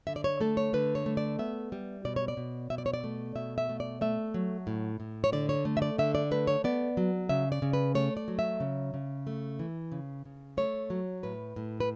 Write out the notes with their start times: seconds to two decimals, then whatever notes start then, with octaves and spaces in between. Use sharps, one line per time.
0.07 D3 E5
0.16 D5
0.24 C#5
0.41 A3 A4
0.57 C#5
0.73 D3 B4
0.95 C#5
1.06 A3
1.17 D5
1.39 B3 E5
1.72 G3
2.05 B2 D5
2.16 C#5
2.28 D5
2.37 B2
2.70 B2 E5
2.78 D5
2.86 C#5
2.94 D5
3.04 A3
3.35 B2 E5
3.58 E5
3.69 A3
3.80 D5
4.01 A3 E5
4.34 F#3
4.67 A2
5.00 A2
5.24 C#5
5.33 D3 D5
5.49 C#5
5.65 A3
5.77 E5
5.82 D5
5.98 D3 E5
6.15 D5
6.31 A3 B4
6.47 C#5
6.64 B3 D5
6.97 F#3
7.29 C#3 E5
7.52 D5
7.62 C#3
7.73 B4
7.95 A3 C#5
8.17 D5
8.28 F#3
8.39 E5
8.60 C#3
8.94 C#3
9.27 A3
9.59 E3
9.92 C#3
10.25 C#3
10.57 A3 C#5
10.90 F#3
11.23 A2 B4
11.56 A2
11.80 B4